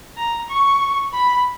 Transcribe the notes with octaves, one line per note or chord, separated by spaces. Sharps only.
A#5
C#6
B5